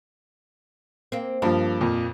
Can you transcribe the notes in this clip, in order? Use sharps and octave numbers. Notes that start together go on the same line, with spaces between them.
A#3 C4
G2 F3 A#3
F2 A#2